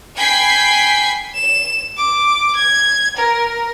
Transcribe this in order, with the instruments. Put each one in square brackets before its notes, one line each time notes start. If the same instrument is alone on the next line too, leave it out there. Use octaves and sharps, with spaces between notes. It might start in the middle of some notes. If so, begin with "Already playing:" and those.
[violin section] G5 G#5 B5 G#6 B6 C7
[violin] E7
D6
G#6
A#4